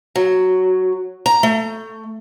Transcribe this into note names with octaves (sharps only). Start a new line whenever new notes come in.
F#3
A#5
A3